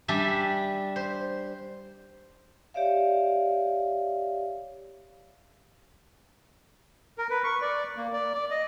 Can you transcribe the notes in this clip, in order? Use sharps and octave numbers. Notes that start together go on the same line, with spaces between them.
G3 D4 E5 G#5
C5
G4 C#5 D5 E5 F5
A#4
B4
C#6
D5
A#3
D5
D5
D#5